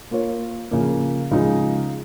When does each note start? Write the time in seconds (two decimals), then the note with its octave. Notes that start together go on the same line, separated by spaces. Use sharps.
0.11 A#3 F4 A#4 C#5
0.71 C#3 F3 A#3
1.31 C#3 F3 G#3 D#4